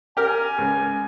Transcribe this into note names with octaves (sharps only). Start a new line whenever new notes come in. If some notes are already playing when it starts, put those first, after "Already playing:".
G4 A#4 G#5
C#2